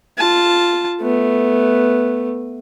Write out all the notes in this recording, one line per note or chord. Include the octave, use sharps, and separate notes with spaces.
F4 A5
A3 B3